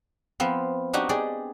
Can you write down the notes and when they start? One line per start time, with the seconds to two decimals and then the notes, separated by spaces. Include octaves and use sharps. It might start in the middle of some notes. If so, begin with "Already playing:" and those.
0.40 F3 B3 C4
0.93 D4 D#4 F#4 G4
1.09 G4 G#4 D5